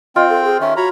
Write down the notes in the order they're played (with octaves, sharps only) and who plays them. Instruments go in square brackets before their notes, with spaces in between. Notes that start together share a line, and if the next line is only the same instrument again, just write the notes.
[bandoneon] C4 G5 [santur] F4 [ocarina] D#5
[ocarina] A4
G#4
[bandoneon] D#3 C#4 [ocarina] E5
[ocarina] F#4 [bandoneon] C#5 A#5 B5